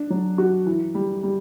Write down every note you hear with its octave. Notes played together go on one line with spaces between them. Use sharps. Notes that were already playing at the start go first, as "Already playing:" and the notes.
Already playing: D4
F#3
F#4
E3
G3
G3